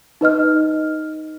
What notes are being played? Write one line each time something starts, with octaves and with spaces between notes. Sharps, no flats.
D#4 B4 D#5 F6